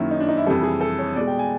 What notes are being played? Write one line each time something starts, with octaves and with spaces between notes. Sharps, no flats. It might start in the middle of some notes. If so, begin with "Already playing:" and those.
Already playing: F#2 D#3 F#3 A#3 E4
D#4
D4
D#4
E4
F2 C3 E3 G3 A4
G#4
A4
C#5
B2 G#3 D5
G5
G#5